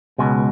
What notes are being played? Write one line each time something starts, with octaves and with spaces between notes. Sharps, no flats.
C#2 B2 G#3